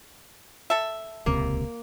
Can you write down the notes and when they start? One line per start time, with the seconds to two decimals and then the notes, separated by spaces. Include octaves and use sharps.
0.70 A4 E5
1.26 D#1 C#2 C3 A#3